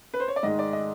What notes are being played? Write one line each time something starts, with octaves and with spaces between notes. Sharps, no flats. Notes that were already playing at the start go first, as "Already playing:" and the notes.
B4
C5
C#5
D5
G#2 D#3 G#3 D#5
D5
D#5